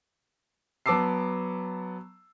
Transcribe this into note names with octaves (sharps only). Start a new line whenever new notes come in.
F#3 B3 A5 D6 E6 C7